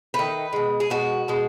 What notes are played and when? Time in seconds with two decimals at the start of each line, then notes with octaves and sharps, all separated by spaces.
0.14 D#3 A3 B4
0.53 B2 G#3
0.80 G#4
0.90 B2 G#3 F#4
1.28 B2 G#3